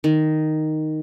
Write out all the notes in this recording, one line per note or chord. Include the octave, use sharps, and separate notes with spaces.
D#3